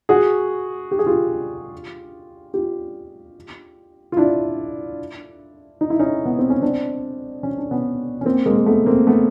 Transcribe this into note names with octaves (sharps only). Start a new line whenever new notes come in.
F#4 G#4
G4
G#4
F4 G4
F4 G4
F4
D4 E4
D#4
E4
C#4 D#4
B3
C4
C#4
C4 D4
C#4
D4
B3 C#4
C#4
A#3 C4
G#3 A#3
A#3
A3 B3
A#3 C4
A3 B3